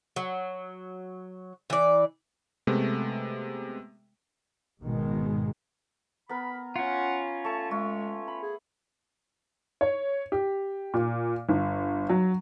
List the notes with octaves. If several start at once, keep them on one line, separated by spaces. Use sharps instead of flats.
F#3
E3 D5
C3 G#3 A3 B3
G#1 G#2 B2 D#3 G#3
B3 A#4 B5
C#4 F4 F#5
A3 A5 C#6
G#3 A3
B5
G#4
C#5
G4
A#2
G1
F#3